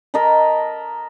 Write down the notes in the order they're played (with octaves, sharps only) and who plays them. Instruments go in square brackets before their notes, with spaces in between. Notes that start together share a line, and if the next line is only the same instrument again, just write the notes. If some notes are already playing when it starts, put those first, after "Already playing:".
[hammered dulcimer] A#4 D#5 A5 B5